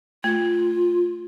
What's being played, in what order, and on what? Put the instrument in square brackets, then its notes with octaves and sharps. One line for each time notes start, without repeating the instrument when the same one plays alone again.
[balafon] A3 [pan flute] F4